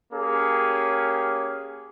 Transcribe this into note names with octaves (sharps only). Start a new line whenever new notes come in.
A#3 C#4 G4 G#4